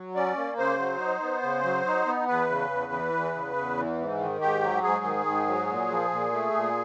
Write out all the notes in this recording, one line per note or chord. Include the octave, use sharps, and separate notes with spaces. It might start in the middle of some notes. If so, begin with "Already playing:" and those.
Already playing: F#3
C#4 D5
A#3
C#3 C5
F#3
D#4
B3
C#3
F#3
D#4
B3
E2 B4
C#3
E2
E3
E2
C#3
E2
E3
G#2
D#3
G#2 G4
F#3
G#2 G#4
D#3
G#2
F#3
A#2
F3
A#2
A3
A#2